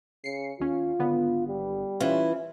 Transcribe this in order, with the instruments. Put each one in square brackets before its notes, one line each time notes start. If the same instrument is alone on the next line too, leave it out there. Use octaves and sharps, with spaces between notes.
[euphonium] C#3 [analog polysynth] C7 C#7
[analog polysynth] D#2 C#4 [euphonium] F4
[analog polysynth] G#1 D3 B3
[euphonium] G3
[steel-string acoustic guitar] E3 E4 [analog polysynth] C#4 F4